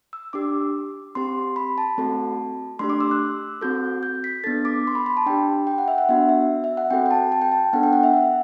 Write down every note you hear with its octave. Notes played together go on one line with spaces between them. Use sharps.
E6
D4 G4 D6
C4 G4 C6
B5
A5
A3 C4 F#4 A4
A3 D4 G4 C6
D6
E6
F#6
C4 F#4 A4 G6
G6
B6
B3 D4 A4 A6
D6
C6
B5
B5
A5
D4 G4 G5
G5
F#5
E5
F#5
B3 D4 F#4 E5
E5
E5
F#5
C4 F#4 A4 G5
G5
A5
A5
G5
A5
B3 D4 A4 F#5
G5
F#5
E5
F#5